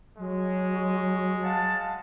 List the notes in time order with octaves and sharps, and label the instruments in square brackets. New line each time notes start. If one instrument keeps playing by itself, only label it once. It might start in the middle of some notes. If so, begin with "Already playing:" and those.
[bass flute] F#3 [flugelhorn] G#3
[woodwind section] F5 F#5 A5